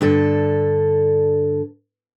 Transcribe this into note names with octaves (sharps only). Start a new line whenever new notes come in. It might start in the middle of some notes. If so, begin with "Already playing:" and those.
G2 D3 A4